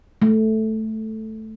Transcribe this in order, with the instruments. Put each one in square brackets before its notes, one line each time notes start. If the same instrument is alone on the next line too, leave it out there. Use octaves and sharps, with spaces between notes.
[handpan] A3